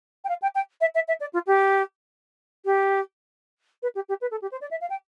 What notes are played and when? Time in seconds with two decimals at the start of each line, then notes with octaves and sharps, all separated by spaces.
0.24 G5
0.29 F5
0.42 G5
0.55 G5
0.81 E5
0.95 E5
1.08 E5
1.20 D5
1.33 F4
1.47 G4
2.65 G4
3.82 B4
3.95 G4
4.09 G4
4.21 B4
4.31 A4
4.42 G4
4.52 C5
4.61 D5
4.71 E5
4.81 F5
4.90 G5